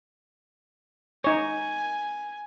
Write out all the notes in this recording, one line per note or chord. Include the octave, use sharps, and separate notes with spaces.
D#4 C#5 G#5